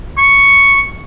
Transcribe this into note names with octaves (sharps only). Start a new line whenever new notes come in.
C#6